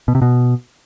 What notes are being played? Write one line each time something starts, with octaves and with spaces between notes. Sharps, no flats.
B2
C3
B2